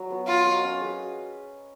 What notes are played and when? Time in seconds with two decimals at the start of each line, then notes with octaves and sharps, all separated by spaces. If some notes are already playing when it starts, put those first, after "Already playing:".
Already playing: F#3
0.10 B3 F#4
0.28 B3 F4
0.46 F#4 A#4 D#5
0.63 C#4
0.81 G#4 B4